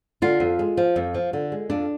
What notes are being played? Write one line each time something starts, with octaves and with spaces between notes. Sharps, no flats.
D3 F4
F2
G#3
F3
F2
F3
D3
G#3
F2 D4